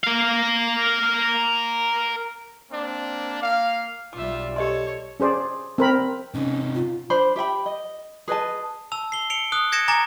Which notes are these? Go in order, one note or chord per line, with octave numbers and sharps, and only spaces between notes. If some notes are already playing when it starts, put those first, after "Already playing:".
A#4 F5
A#3 C4 D4
A#3 F5
B1 G3 F4 E5 D6
G4 A4 C#5 D#5 C6
C#4 G#4 C5 D5
C4 A#4 B5
C3 C#4 D#4
F4
D4 C5 B5
G4 E5 G5 B5
D#5
G#4 B4 D#5 A5
A5 E6 F7
C7 G7
C#7 D7 F7 G7
D#6 F#6
G#6 A#6 C#7 D7 E7
G#5 A#5 D6 A6 C#7